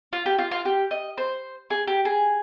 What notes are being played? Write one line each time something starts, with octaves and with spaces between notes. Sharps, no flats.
F4
G4
F4
F4
G4
D#5
C5
G#4
G4
G#4